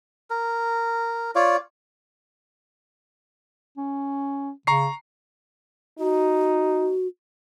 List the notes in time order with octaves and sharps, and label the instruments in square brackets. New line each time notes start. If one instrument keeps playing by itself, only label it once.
[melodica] A#4
F4 C#5 D5
[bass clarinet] C#4
[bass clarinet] C#3 [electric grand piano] A#5 C#6 C7
[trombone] D#4 [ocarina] F#4